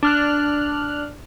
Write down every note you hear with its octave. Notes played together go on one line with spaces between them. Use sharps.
D4 F6 F#6